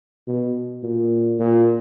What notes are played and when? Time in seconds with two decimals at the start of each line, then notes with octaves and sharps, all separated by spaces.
0.27 B2
0.83 A#2
1.39 A#2